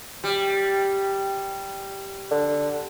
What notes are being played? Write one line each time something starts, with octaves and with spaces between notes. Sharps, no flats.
G3
D3